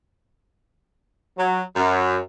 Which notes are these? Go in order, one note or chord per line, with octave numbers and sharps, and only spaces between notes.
F#3
F#2